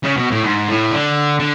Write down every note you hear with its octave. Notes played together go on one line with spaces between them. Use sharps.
C#3
B2
A2
G#2
A2
D3
D3